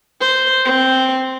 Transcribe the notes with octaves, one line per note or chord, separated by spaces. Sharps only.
C5
C4